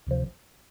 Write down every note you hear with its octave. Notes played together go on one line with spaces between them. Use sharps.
D2 C3 F3